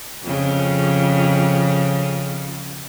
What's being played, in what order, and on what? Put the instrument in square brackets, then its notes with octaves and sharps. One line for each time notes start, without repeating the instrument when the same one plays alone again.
[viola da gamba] F2 C#3